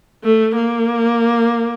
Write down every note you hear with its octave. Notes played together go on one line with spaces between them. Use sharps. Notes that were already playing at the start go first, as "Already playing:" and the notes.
A3
A#3